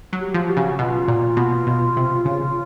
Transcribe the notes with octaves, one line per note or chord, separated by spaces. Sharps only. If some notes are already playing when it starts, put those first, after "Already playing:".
F#3
G4
F3
F#4
C#3
B2 F4
A#2
B2
B2
C3
C#3